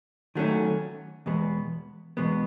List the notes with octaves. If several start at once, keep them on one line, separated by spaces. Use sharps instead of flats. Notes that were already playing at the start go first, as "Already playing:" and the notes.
D#3 F#3 A3 C#4
E2 B2 G#3 B3
E2 B2 G#3 B3